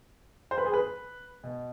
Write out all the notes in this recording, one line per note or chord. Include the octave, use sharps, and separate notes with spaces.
C5
B4
G#4
B4
B2